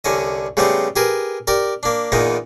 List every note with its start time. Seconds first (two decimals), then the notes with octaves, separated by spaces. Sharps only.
0.04 C2 D3 C#4 D#5
0.57 C#3 G3 A3 B3 C4 G4
0.96 G4 G#4 A#4 B4
1.47 G4 A#4 D5
1.83 A#3 D4
2.12 E2 A#2 A#3 B3 D#4